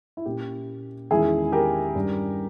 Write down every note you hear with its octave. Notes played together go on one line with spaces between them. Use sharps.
E4
A#2 A#3 C#4 G4
E2 D#3 G#3 C#4 E4 G#4
G4 A#4
G2 G3 C#4